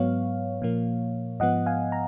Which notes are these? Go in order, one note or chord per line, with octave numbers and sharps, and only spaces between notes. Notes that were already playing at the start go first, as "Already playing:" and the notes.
Already playing: G#2 F#3 B3 C#5 F5
A#2 F3 A#3
G#2 F3 B3 D#5 F#5
F5 G#5
A#5